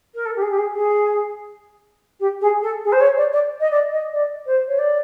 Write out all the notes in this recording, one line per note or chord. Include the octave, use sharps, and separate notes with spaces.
A#4
A4
G4
G#4
G4
G#4
G#4
G4
G#4
A4
G#4
C5
C#5
D5
D5
D#5
D5
D#5
D5
C5
C#5
D5